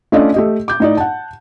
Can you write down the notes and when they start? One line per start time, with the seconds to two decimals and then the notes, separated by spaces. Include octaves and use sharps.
0.12 A3 C#4 D4 F4 D5 D#5
0.34 A3 G4 D#5
0.68 D6 G6
0.80 A2 D#4 D5
0.97 F#5 A5